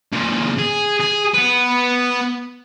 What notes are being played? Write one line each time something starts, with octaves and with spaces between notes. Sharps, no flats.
A#2 C#3
G#4
G#4
B3 B4